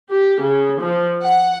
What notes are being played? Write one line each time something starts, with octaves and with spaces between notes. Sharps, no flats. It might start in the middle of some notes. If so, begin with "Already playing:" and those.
G4
C#3
F3
F#5